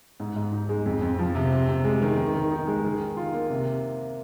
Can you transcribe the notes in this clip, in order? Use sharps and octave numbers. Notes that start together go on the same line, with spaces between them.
G#2
G#2
D#4
G#3
F2
F2
F3
C3
C3
C3
G#3
D#3
D#3
D#3
D#4
G#3
D#3
D#3
F4
A#3
C3